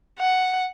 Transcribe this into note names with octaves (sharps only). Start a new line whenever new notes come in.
F#5